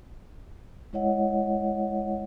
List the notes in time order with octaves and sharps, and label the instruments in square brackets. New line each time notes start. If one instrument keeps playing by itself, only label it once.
[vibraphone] G#3 E4 C#5 D#5 F#5